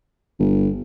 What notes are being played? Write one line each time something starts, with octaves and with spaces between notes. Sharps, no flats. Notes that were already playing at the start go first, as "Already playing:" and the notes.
G1